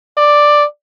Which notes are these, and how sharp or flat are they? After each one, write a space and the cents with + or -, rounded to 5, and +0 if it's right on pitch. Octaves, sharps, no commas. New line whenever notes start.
D5 +5